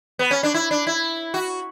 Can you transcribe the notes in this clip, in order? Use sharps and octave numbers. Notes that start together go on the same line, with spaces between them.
B3
C#4
D4
E4
D4
E4
F#4